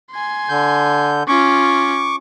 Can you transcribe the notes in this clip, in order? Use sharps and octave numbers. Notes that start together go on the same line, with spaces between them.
G#5 C6
D3 G6
C#4 F4 C#6 D6